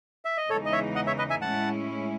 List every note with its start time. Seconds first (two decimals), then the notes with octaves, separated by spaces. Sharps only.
0.25 E5
0.37 D#5
0.50 E2 C#3 E3 G#3 D#4 A4 C#5
0.66 D#5
0.73 C#5 E5
0.95 D#5 F#5
1.07 C#5 E5
1.18 B4 D#5
1.30 E5 G#5
1.42 A2 G#3 C#4 E4 F#5 A5